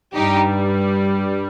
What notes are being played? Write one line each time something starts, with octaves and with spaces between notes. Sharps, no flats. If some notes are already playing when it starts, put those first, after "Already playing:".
G2 G3 D#4 G4